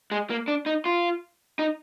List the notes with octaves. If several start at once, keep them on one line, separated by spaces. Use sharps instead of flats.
G#3
A#3
D4
D#4
F4
D#4